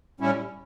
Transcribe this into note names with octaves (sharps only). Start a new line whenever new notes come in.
A2 G3 C#4 E4